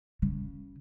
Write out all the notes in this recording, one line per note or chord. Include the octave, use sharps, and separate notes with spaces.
C#3